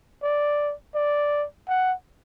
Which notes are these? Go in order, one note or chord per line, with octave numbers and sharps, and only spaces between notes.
D5
D5
F#5